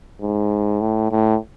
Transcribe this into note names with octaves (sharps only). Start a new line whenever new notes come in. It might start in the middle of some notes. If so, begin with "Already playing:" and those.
G#2
A2
A2